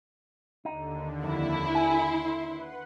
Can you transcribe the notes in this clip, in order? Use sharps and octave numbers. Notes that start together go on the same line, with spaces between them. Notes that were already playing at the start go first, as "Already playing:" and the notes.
D#2 D3 D#4
F2 E4
G#5 C6
B4 F#5